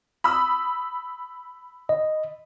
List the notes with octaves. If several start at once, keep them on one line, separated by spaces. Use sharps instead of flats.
B5 D#6 E6
D#5